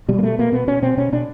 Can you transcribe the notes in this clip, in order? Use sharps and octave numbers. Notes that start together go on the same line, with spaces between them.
B2 G3
A#3
B2 A3
B2 A#3
B2 B3
B2 C#4
B2 C4
B2 C#4
B2 D4